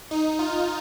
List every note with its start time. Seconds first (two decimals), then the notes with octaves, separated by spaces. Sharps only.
0.11 D#4
0.39 F4